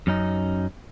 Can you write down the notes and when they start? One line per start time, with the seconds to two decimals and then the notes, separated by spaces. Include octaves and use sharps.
0.07 F#2 C#4 D#4